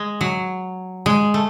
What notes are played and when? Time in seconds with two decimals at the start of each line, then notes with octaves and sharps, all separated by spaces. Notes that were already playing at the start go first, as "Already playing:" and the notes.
Already playing: G#3
0.21 F#3
1.06 G#3
1.34 A3